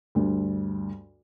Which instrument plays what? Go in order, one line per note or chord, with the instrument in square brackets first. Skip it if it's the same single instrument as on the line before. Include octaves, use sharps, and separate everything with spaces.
[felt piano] D2 G2